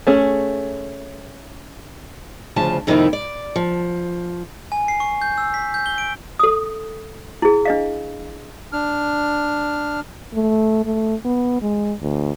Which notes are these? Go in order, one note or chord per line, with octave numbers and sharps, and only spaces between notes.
A3 C#4 G#4
D2 C#3 F3 A5
F2 C3 D#3 F3 A#3 E4
D5
F3
G#5
C7
C#6
G6
E6
B6
G6
G7
D7
A4 D#6
E4 G#4
D4 D#5 F5
D4 F6
A3
A3
B3
G#3
D2